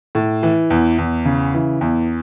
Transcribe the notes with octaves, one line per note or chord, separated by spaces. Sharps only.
A2
E3
E2
E2
C#3
E3
E2